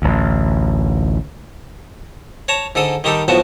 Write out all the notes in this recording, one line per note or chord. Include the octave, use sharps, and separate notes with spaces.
A1 D2
C#5 A5 A#5
G#2 D3 A4 D#6
D#3 G3 D#4 G4 A4
B1 A2 F3 B3 F#4 A5